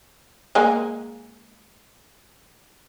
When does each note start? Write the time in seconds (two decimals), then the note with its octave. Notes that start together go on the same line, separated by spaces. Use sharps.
0.55 G#3 A#3 G#5